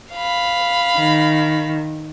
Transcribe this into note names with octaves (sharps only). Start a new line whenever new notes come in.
F5 B5
D#3